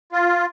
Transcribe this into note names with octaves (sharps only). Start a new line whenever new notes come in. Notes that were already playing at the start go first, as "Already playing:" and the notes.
F4